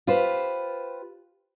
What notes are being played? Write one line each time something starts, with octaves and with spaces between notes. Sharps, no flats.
F4 G4 B4 C5